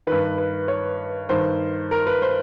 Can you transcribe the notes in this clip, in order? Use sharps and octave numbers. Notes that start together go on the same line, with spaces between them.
G2 D#3 B4
B4
C#5
G2 D#3 C5
A#4
B4
C5